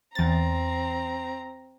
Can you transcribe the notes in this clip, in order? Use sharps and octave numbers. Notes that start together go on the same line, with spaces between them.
E2 C4 A#5 A6